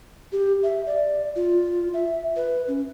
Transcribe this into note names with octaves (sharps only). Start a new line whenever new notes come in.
G4
E5
D5
F4
E5
B4
C#4